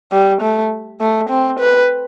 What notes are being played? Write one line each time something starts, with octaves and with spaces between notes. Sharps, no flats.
G3
A3
A3
C4
B4